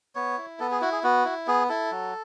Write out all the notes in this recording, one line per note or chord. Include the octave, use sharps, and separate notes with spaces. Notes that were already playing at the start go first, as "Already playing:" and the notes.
B3 C#5
E4
B3 A4
G#4
E4 F#4
G#4
B3 F#4
E4
B3 G#4
E4 A4
F#3